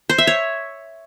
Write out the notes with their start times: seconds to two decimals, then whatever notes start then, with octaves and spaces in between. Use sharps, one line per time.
0.09 C5
0.18 E5
0.27 C#5